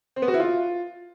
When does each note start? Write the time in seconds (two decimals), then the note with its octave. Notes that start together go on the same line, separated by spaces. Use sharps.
0.16 C4
0.22 B3
0.28 F#4
0.34 E4
0.40 F4